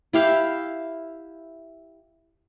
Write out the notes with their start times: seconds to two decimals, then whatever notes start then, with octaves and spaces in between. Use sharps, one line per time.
0.13 E4 G4 F5